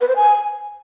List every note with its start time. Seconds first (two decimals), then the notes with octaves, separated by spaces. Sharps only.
0.01 B4
0.08 C5
0.16 G#5